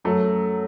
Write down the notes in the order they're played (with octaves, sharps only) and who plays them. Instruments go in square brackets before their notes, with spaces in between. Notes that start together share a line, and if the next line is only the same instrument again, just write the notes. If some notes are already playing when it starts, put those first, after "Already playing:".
[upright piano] F#2 F#3 A3